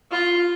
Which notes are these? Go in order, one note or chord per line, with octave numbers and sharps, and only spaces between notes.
F4